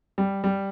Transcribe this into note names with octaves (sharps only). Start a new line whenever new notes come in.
G3
G3